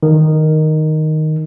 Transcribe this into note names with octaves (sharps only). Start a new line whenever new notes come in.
D#3